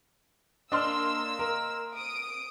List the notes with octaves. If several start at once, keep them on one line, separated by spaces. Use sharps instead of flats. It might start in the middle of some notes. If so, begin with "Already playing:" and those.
A#3 D4 D#5 C6 E6 F6
A#4
D#6 D7